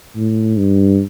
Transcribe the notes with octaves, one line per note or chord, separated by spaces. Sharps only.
A2
G2